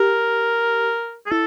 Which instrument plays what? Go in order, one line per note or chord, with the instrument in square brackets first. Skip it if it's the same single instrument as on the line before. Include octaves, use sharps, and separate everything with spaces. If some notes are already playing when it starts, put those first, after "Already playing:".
Already playing: [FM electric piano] G4 [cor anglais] A#4
[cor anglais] G#4
[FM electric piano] E4 [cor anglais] A4